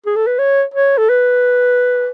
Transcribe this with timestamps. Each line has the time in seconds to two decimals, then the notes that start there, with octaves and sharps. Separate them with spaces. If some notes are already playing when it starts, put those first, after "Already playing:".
0.06 G#4
0.16 A4
0.27 B4
0.39 C#5
0.74 C#5
0.98 A4
1.09 B4